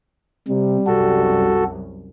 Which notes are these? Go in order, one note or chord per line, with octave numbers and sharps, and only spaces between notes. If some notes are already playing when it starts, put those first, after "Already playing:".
C3 G3
C2 F#2 F#4 A4